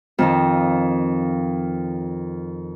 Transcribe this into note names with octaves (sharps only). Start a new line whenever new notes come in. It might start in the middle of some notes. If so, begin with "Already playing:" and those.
F2 D#3 F3